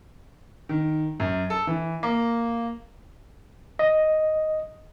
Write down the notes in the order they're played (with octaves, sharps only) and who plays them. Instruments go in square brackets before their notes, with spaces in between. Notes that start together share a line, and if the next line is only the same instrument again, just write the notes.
[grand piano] D#3
F#2
A4
E3
A#3
[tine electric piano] D#5